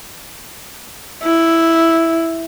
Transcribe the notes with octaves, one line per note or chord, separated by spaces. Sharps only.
E4